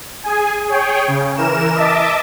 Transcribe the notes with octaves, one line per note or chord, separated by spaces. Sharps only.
G#4 G#5
G#4 C#5 G5
C#3
E3 A#4 E7
D#5 E5 A5 D6